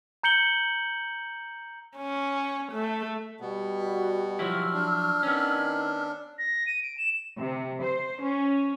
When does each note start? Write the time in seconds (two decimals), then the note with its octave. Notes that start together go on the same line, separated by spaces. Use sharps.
0.23 A#5 G6 C#7 F#7 G7
1.97 C#4
2.72 A3
3.40 B2 G3 B3
3.80 F#4
4.39 F3 F#3 E4 E6 F6
4.73 D4
5.23 D#3 B3 C#4
6.38 A#6
6.66 D#7
6.83 D7
6.97 E7
7.38 C3
7.82 C5
8.22 C#4